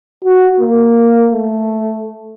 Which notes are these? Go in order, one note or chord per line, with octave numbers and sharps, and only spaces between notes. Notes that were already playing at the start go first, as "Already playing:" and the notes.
F#4
A#3
A3